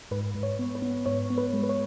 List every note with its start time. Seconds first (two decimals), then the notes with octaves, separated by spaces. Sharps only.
0.11 G#2 B4
0.35 G#2
0.43 C#5
0.59 B3
0.75 B4
0.82 B3
1.06 G#2 C#5
1.30 B3
1.38 B4
1.53 G#3
1.63 B4
1.69 C#5